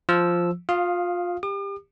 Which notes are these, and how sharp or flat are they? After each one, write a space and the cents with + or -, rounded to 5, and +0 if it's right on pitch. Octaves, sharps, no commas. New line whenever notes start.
F3 +0 E6 +0
F4 +25 F5 +0 D#6 +0
G4 +20 D6 +45